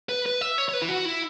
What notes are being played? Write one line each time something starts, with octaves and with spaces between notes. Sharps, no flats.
B4
B4
E5
C#5
C#5
B4
E4
F#4
E4